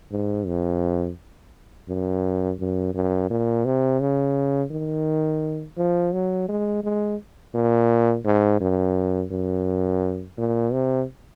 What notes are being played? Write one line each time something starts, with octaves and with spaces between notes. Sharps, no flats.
G#2
F2
F#2
F#2
F#2
A#2
C3
C#3
D#3
F3
F#3
G#3
G#3
A#2
G#2
F#2
F#2
A#2
C3